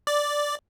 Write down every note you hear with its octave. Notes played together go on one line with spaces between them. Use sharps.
D5